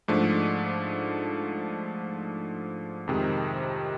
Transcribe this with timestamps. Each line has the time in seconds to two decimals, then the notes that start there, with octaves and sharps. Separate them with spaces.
0.08 G#2 F3 A3 D4
3.08 F2 C3 D#3 G#3